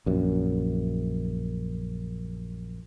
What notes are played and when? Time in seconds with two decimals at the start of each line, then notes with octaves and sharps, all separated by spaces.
0.06 A#1 F#2